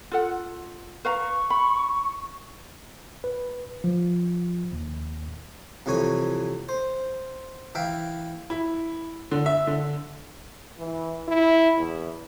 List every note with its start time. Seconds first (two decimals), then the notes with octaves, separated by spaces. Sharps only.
0.12 F4 A4 F#5
1.05 B4 F5 A#5 C#6
1.50 B5
3.24 B4
3.84 F3
4.73 D#2
5.86 C2 F2 E3 C#5 G#5
6.69 C5
7.75 E3 E5 F5 G5
8.50 E4
9.31 D3
9.46 E5
9.67 D3
10.78 E3
11.28 E4
11.78 E2